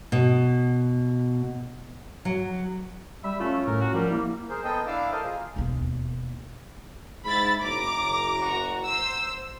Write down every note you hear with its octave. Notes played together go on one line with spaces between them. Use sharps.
B2
F#3
G3 E5 B5
A3 C#4 F4
A2 A#4
F#4
F3 G3 A#4
A#3 E4
G#4 A#4 C5
B3 A4 D#5 G5
D4 E4 F5 D6 E6
A4 A#4 C5 D#5 F5
F4 G#4
E1 D#2
G#2 E4 B5 A6
F#1 A#5 D6
F#4
C5 E6